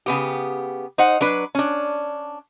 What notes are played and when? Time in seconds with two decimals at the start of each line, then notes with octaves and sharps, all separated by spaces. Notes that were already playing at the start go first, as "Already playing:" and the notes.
0.06 C#3 B3 G4
0.98 D#4 C5 F#5
1.21 F#3 D4 B4
1.55 C#4 D4